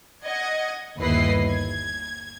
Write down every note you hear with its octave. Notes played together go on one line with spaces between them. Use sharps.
D#5 F#5 G#6
G1 D#2 E4 B4 D#5 C7
G#6